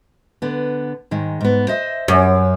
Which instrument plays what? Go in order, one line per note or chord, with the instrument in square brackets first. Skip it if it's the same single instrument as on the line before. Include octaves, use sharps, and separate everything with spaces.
[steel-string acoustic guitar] D3 B3
G#2 D#3 G#3
G#2 B3
C5 D#5 E5
[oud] F#2